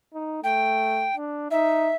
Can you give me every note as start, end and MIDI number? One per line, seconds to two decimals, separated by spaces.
0.14 0.41 63
0.44 1.08 57
0.44 1.15 79
1.17 1.51 62
1.51 1.91 63
1.51 1.96 76